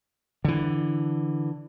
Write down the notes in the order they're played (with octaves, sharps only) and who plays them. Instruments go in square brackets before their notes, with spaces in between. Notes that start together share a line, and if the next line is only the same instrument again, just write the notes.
[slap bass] D3 E3